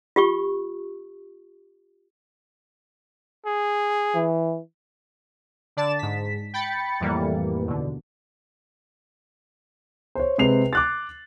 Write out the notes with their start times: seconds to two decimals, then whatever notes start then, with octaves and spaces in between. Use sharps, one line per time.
0.16 F4 G4 C#6
3.46 G#4
4.15 E3
5.77 D3 D5 A5 A6 E7
5.99 G#2 B6
6.54 G5 B5 A6 C#7
7.00 F2 A2 E3 G3 A#3
7.66 D#2 B2 D3
10.15 C5 C#5
10.38 C3 G#3 C4 B4 C7 F7
10.73 D6 F#6 A6